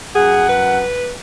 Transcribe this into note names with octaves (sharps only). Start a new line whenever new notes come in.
F#2 G#4 F#5
B4